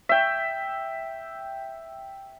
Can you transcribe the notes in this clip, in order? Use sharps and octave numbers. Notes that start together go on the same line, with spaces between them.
E5 G5